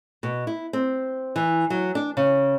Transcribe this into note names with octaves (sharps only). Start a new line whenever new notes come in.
B2
E4
C4
E3
F#3
D4
C#3